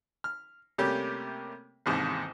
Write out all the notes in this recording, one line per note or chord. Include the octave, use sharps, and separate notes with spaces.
F6
C3 G3 A3 A#3 C#4 G4
A1 D#2 G#2 C3